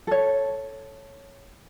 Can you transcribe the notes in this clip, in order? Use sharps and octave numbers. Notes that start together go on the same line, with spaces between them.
A4 C#5